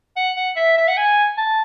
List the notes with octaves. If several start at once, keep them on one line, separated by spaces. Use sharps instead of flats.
F#5
F#5
E5
E5
F#5
G#5
A5